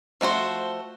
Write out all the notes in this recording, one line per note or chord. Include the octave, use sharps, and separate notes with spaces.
F3 A3 F#4 C5